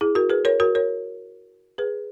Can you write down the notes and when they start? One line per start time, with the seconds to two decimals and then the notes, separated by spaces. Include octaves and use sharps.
0.01 E4 G#4
0.15 F#4 A#4
0.30 G#4 B4
0.45 A#4 C#5
0.60 F#4 A#4
0.75 A#4 C#5
1.78 G#4 B4